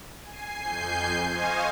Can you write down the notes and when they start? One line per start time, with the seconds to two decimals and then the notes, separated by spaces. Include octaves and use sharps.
0.22 G#5 C7
0.56 F2 G#5 G6 C7
1.28 C5 D#5 F5 G#5 C6 C#6